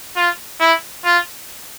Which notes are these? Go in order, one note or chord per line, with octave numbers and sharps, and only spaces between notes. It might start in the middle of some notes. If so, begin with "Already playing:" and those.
F4
E4
F4